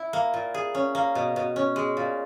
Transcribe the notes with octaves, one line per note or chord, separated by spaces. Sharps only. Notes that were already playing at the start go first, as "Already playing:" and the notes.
Already playing: E4
A#3
A#2
G#4
C#4
A#3
B2
B2
C#4
G#3
A#2